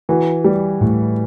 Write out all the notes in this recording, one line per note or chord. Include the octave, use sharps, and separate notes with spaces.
E3 F#4
G3
A2